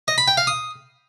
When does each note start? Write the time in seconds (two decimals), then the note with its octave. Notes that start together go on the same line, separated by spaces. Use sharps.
0.08 D#5
0.18 B5
0.28 G5
0.37 F5
0.47 D#6